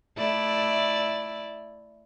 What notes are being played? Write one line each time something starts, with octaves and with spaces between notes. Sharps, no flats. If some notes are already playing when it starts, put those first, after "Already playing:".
A3 E4 D5